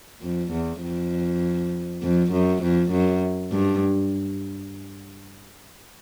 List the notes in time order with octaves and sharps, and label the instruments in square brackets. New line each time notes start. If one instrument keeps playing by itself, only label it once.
[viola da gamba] F2
E2
F2
F2
F#2
F2
F#2
G2